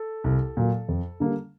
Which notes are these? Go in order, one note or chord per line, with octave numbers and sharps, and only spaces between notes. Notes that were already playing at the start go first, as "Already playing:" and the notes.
Already playing: A4
C2
A#2 F#3 A#3
F2
D3 G3 A#3